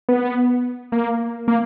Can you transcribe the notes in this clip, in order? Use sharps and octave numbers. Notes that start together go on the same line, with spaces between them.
B3
A#3
A#3